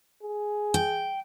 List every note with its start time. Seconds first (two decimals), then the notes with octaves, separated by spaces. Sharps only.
0.22 G#4
0.74 G5